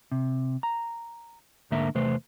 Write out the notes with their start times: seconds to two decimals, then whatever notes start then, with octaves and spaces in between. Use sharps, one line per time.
0.12 C3
0.63 A#5
1.71 D2 G#2 D3 A#3 A#4 E5
1.95 E2 C3 A3 B4 C5